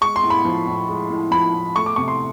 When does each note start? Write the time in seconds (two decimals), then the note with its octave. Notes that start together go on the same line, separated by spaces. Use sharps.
0.01 G#3 C#6
0.16 C6
0.23 A2
0.30 B5
0.45 F3
0.67 A2
0.88 G#3
1.10 A2
1.31 F3 B5
1.54 A2
1.75 A3 C#6
1.86 D6
1.96 C3 C#6
2.08 C6